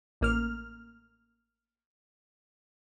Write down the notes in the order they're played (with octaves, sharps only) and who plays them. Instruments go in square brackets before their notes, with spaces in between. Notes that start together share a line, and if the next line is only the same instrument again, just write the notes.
[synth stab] A1 A#3 F6